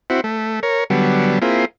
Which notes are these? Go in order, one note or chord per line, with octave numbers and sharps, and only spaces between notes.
C4 E4 F#4
A3
A#4 C#5
D3 F#3 G3 B3
A#3 C4 E4 F4 G#4